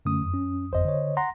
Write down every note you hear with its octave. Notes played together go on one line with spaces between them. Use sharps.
F#2 D3 A3 C#4 D#6
F2
C#4
G1 F2 C5 D#5
D3 C#5
F#5 A#5 C6 A#6